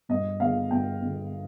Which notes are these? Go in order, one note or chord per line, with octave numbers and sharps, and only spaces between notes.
G2 D#5
D3 G#3 F5
G2 G5
D3 G#3